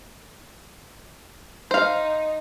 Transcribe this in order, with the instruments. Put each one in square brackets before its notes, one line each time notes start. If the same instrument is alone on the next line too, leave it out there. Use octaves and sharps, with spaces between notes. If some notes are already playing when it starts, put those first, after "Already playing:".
[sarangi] D#4 [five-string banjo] C5 F5